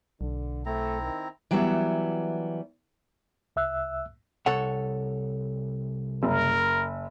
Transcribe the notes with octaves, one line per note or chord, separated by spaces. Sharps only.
B1 D3
A3 C4 E4 A#5
D#3
E3 F#3 G3 B3 E5
C2 E5 E6 F#6
C2 A4 C#5 F#5
F#1 A#4